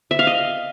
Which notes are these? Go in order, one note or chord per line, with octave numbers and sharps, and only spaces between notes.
E5
F5
D#5